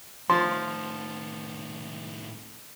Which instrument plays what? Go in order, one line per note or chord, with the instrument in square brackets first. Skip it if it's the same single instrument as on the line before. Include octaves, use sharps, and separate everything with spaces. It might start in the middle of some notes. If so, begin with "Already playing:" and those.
[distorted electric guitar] A2 D#3 [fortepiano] F3 [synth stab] C6